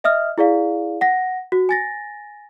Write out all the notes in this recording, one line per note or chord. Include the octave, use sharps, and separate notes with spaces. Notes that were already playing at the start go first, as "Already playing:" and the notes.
D#5 E5 D#6 F6
E4 G#4 D5 F5
F#5 A#6
F#4
G#5 A6 A#6